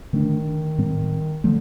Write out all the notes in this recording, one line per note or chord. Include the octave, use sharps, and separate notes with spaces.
D3 D#3 A3 D4
A2 G3 C4
D3 F3 A3